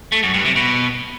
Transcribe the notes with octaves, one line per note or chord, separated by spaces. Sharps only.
A3
F#2
G2
C3
B2